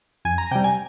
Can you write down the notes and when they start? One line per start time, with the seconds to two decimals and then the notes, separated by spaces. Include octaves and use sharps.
0.25 F2 G#5
0.38 A#5
0.51 C3 G3 G5
0.64 G#5